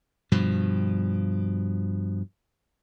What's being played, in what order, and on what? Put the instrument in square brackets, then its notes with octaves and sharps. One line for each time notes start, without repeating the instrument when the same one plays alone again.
[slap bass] G2 B2 F3